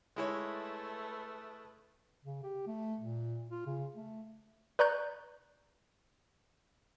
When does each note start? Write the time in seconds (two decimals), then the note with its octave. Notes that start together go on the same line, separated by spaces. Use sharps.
0.16 G#3 A3 E4 B4 C#5
2.25 C#3
2.43 G4
2.67 A3
3.00 A#2
3.50 F4
3.66 C#3
3.96 A3
4.79 B4 D5 A#5 C#6 F#6 G6